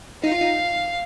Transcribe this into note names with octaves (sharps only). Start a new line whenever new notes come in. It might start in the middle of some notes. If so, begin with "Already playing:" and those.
D#4 F5
F4
D#4